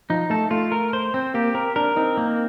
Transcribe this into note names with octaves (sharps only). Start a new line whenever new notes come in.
F3 D#4
A3 A4
A3 F4
A#4
C5
C4
A#3 G4
C4 A#4
D4 A#4
C4 D#4
A#3